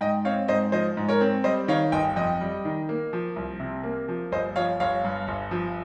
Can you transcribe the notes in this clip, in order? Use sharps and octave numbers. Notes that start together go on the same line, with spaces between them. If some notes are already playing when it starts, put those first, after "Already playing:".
G#2 D#5 G5
C4 C#5 F5
G#2 C5 D#5
F3 C5 D#5
G#2
A#4 C#5
C4
G3 C5 D#5
D#3 C#5 F5
G1 D#5 G5
F2 D#5 G5
G3
D#3
A#3
F3
C2
C3
A#3
F3
G1 C5 D#5
F3 C#5 F5
G1 C#5 F5
G2
G1
F3